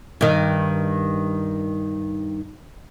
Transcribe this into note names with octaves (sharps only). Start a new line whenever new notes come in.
G2 D#3